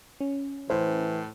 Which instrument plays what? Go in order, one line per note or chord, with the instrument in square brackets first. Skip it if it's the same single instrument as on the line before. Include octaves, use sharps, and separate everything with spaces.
[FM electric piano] C#4
[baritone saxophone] A2 [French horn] E3 [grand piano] C5